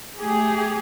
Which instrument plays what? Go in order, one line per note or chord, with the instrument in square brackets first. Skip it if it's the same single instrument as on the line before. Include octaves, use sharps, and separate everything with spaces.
[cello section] A3 G4 G#4